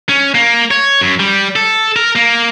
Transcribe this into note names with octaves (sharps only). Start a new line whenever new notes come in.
C#4
A#3
C#5
F#2
G3
A4
A#4
A#3